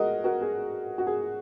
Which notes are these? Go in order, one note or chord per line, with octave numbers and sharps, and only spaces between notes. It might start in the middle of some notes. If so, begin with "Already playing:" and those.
Already playing: F#4 G#4 A#4 D#5
F#4 A#4
G#4
F#4
G#4